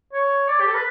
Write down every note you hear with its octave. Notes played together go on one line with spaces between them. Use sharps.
C#5
D5
G4
A4
B4